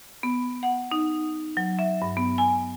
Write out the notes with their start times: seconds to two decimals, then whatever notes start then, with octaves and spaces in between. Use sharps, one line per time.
0.23 B3
0.63 F#5
0.91 D#4
1.57 F#3
1.79 E5
2.02 G2
2.17 B3
2.38 G#5